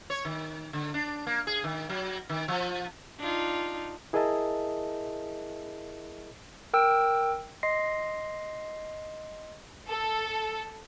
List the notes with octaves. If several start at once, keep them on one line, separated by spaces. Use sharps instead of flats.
C#5
D#3
D3
D4
A#3
G#4
D#3
F#3
D#3
F3
D4 D#4 F4
E4 G#4 A#4 D#5 E5 A5
A#4 G5 E6 D7
D#5 C6 A#6 C7
A4